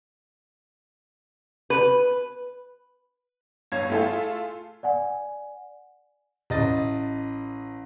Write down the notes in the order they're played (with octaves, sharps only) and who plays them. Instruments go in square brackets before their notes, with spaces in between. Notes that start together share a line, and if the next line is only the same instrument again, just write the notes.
[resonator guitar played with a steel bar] B4
[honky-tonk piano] G2 C#5 F5 G#6
A3 E4 F4 G#4 A4
[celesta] D5 F#5 G#5
[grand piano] A1 D#5 A6